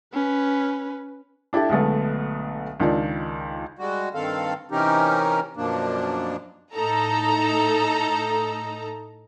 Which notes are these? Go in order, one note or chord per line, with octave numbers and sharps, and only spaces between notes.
C#4 B4
D4 E4 G4 A4 A5
B1 D3 G#3 A3 B3
C#2 D#3 D4 F4 D5
G3 G#3 F#4
G2 D#3 C4 A4 F5
C3 E3 C#4 D#4 G4 A#4
F#2 B2 F3 A#3 D4
A2 D#4 A4 A#5